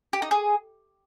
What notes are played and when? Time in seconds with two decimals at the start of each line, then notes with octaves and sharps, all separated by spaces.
0.13 G4
0.22 D#4
0.31 G#4